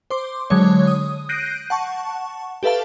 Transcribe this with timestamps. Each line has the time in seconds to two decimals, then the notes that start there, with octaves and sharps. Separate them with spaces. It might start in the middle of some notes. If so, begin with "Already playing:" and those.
0.10 C5 C6 D6
0.50 D3 F#3 G#3 C#5
0.87 D#6
1.29 F#6 G6 A#6 C7 D7 D#7
1.70 F#5 A5 C#6
2.63 G4 A4 B4 E5 F5 A5